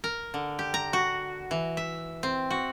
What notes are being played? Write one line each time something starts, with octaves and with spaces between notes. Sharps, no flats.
A#4
D3
G4
A#5
F#4
E3
E5
C4
F#4